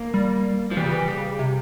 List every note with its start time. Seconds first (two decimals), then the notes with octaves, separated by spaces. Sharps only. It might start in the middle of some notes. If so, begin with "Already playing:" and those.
Already playing: A#3
0.14 G3
0.71 F3
0.77 E3 G3
0.84 C#3
0.91 E3
1.08 C#3
1.39 C3